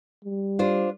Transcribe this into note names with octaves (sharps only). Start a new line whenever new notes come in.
G3
D4 F4 C5